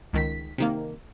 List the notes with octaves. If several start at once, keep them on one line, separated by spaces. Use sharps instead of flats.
C#2 D#3 B6
C3 D#3 A#3